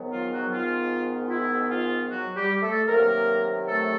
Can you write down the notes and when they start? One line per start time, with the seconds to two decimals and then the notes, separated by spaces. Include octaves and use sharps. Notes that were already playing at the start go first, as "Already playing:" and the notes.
Already playing: G#2 D#3 F#3 B3
0.12 F4
0.32 F#3 F#4
0.52 F4
1.26 F4
1.30 E4
1.70 F4
2.09 F#3 F#4
2.36 G3 G4
2.62 A3 A4
2.88 C3 D#3 F#3 A#3 B3 A#4
3.67 A3 A4